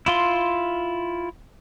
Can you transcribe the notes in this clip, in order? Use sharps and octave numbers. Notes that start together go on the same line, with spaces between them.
E4 F4 C6